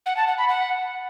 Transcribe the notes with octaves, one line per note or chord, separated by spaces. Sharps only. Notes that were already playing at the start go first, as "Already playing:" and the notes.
F#5
A5
F#5
B5
F#5